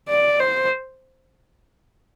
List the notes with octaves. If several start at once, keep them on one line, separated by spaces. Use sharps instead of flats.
D5
C5